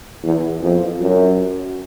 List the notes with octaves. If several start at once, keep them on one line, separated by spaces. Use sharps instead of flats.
E2
F2
F#2